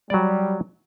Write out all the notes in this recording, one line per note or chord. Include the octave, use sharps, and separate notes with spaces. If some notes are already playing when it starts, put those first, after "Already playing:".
F#3 G3 D5